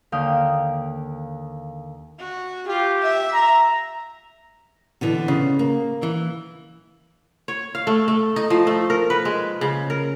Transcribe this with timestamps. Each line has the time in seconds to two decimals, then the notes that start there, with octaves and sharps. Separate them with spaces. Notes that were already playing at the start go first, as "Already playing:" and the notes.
0.12 D#2 D3 F5 G5 D#6 F6
2.19 F#4
2.67 F4 G4
3.02 E5
3.34 A#5
5.01 B2 D3 E3
5.28 C#3
5.59 A#3
6.03 E3
7.48 C#5
7.75 F5
7.87 A3
8.08 A3
8.36 D#4
8.50 F3
8.67 A3
8.90 A#4
9.10 B4
9.25 G#3
9.61 C#3
9.90 A#4